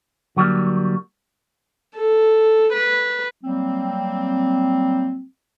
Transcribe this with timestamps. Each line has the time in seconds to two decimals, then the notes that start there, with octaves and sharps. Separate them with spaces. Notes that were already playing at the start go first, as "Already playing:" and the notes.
0.37 D3 F#3 G3 A#3
1.96 A4
2.74 B4
3.43 F#3 G3 A#3 C4